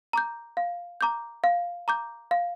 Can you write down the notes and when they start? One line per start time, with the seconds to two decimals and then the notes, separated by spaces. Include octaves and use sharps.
0.13 A#5 D6 G6
0.57 F5
1.01 A#5 D6 G6
1.44 F5
1.88 A#5 D6 G6
2.31 F5